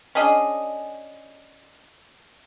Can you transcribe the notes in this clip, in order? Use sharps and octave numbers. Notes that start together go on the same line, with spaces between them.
C#4 D4 G#4 D#5